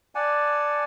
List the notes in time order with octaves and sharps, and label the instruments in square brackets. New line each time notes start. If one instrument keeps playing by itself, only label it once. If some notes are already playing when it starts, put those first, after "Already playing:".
[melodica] D5 F#5 G#5 A5